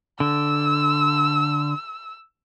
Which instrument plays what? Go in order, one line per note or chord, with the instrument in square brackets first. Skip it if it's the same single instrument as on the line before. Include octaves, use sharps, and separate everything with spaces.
[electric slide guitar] D3 [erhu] E6